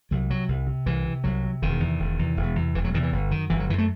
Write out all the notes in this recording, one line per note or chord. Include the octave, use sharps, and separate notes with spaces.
C2 F#3
C3 F#3
C2
C3
C2 E3
C3
C2 F#3
C3
E1 D#3
E2 C3
E1
E2 C3
E1
E2 C3
E1 E3
F#3
E2 C3 D#3
E3
G1
F#2 D#3
G1 E3
F#3
F#2 E3
A3